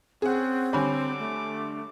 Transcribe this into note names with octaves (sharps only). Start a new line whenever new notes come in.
C4 C#4 G#4 F#5
D3 G3 C#5 G#5 B5 D6
A3